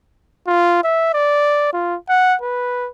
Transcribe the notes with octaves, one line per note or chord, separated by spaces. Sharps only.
F4
E5
D5
F4
F#5
B4